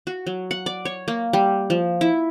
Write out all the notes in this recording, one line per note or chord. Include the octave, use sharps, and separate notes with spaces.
F#4
F#3
F#5
D5
C#5
A#3
G3
F3
E4